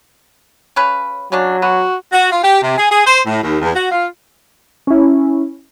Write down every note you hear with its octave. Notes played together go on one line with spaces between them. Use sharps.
C#3 C#4 B4
C#3 F#3 C#4 D4
B3 F#4
F#4
F4
G4
C3
G#4
G#4
C5
A2
D#2
E2
F#4
F4
C#4 E4